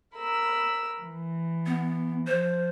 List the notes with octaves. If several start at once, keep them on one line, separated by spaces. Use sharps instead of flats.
A#4 B5 E6
E3
B3
F3 C5